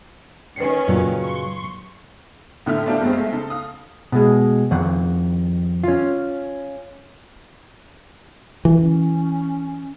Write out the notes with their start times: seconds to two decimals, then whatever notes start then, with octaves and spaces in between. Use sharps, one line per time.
0.56 D#3 C#4 B4 C7 C#7
0.88 F#2 A#2 C#3 F#3 G#5
1.22 C6 C#6
2.66 A2 D3 A3 F6
2.86 A3 A#3 D4 E4 G4 A4
3.02 G2 G#3 A3 B3 C4
3.13 G#3 A3
3.32 C#3 D#4 A4
3.50 F5 D#6
4.12 B2 G#3
4.71 F2 D#3 F#5
5.84 C#4 F4
8.65 E3
8.80 C#4